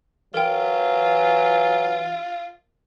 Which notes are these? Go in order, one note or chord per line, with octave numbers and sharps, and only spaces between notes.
E3 F#3 F4 A#4 G5